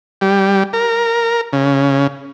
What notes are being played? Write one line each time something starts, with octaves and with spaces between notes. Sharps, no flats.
G3
A#4
C#3